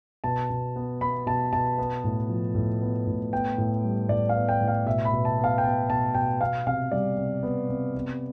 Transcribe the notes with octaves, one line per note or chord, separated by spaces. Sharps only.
B2 A5
B2
B3
B3 B5
B2 A5
B2 A5
B3
A2
F3
A2
B3
A2
B3 G5
A2
G3
A2 D5
F5
B3
G5
A2
F5
B2 E5
B5
B2
A5
B3
F5
G5
B3 A5
B2 A5
B2 G5
B3 F5
C3 F5
G3 D5
C3
B3
C3
B3